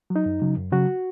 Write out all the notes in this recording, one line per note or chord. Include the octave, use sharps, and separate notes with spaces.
F#3
D#4
F#2
C#3 F#3
F#2
C#3 F#3 F#4